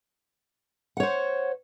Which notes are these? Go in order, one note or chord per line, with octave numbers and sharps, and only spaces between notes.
C5 C#5 F#5